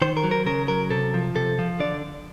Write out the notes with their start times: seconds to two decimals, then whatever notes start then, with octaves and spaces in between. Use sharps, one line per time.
0.02 D#3 C5
0.17 A#4
0.24 F#3
0.31 A#4
0.46 C#3 A#4
0.68 F#3 A#4
0.91 C3 A4
1.14 F3
1.36 C3 A4
1.59 F3
1.80 D3 D5